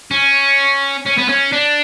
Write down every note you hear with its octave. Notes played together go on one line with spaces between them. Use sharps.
C#4
C#4
B3
C#4
D4